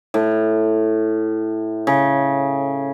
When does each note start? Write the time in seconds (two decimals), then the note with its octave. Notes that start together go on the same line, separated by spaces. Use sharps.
0.14 A2
1.87 C#3